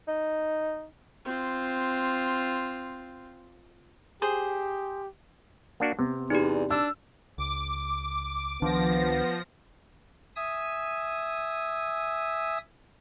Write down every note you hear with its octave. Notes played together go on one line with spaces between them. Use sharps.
D#4
C4 F4
G4 G#4 C5
A#3 D4 F#4
C3 B3
E2 D4 D#4 G4
D4 E6
C#2 D6
C#2 D#3 F3 B3 D4 A#6
E5 G#5 D#6 E6